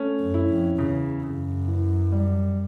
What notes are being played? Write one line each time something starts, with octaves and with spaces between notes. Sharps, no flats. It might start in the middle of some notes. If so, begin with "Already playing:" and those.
Already playing: A3 C#4
F#2
E4
F2
E2 C#3
F#2 C#3
E3
G3